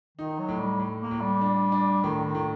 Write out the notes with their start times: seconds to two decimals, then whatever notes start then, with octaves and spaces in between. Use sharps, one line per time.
0.17 D#3 D#4
0.39 F#3
0.49 A2
0.59 G3
0.79 A2
1.01 A#3
1.11 A2
1.21 G3
1.41 D4
1.72 D4
2.03 A2 D#3
2.24 D#3
2.35 A2